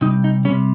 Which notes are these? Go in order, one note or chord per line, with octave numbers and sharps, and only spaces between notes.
C3 G3 D#4
D#4
C3 G3 C#4